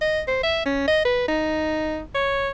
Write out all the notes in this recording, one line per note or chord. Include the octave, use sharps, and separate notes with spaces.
D#5
C5
E5
C#4
D#5
B4
D#4
C#5